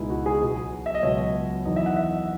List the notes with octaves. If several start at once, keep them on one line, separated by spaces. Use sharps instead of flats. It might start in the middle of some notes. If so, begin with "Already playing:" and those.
Already playing: C#2 B2 G#3 D#4 E4
F#4
G#4
B1 B2 F#3
E5
D#5
C#2 B2 F#3 C#5
E2 D#3 F#3 D#5
E5
F#5
E5